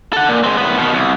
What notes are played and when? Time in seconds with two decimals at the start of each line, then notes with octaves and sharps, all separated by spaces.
0.13 A4 F#5
0.29 A#2
0.44 G#3 C4
0.57 A2 B3
0.78 B2 D#3
0.94 C2